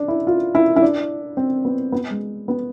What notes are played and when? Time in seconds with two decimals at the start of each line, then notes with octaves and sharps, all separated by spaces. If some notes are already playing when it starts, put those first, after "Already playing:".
Already playing: D4
0.08 E4
0.27 F4
0.55 E4
0.76 E4
0.82 D4
1.37 C4
1.65 B3
1.92 B3
2.11 G#3
2.48 B3